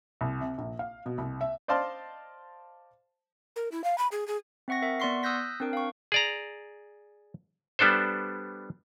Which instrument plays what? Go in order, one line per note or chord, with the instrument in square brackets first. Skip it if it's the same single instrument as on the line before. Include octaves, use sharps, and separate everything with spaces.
[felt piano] C2
C3
A#1
F5
B2
C2
E5
[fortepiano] C5 D5 D#5 F5 A5 C6
[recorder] A#4
E4
F5
B5
G#4
G#4
[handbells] C4 E5 F#5 C#6 A#6
A#4 E5
B3 D5 F#5 C6 C#6 C7
D#6 E6 F#6 G6 A#6 B6
C4 D4 A#4 G5
F5 C#6
[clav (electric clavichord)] G#4 D5 A#5
G3 B3 D4 A4 C5